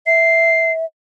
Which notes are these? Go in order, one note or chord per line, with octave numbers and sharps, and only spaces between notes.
E5 C7